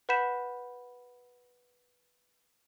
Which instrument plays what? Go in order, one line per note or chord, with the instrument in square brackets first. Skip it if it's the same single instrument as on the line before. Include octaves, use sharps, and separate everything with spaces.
[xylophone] B4 F#5 B5 G6 B6 E7